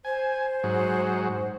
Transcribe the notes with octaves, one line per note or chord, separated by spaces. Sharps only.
C5 G#5
G#2 F#3